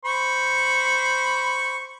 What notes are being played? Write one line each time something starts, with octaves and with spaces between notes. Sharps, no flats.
C5 B5 C#6